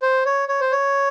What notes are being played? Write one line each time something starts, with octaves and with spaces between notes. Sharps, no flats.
C5
C#5
C#5
C5
C#5